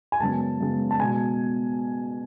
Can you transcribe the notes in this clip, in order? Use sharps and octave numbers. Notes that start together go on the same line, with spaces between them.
G#5
F#2 C#3 G#3 B3 A5
F#2 C#3 G#3 B3
A5
B2 G#3 B3 G#5